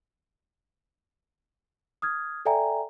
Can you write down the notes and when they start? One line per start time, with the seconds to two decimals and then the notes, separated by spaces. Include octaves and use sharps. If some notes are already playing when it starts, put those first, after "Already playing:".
2.02 D#6 F6 G#6
2.45 A4 D5 E5 G5 G#5 A#5